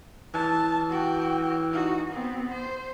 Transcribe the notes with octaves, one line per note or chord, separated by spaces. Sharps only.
E3 A5
F#4 G5
D#4 F#4
B3 C4
C5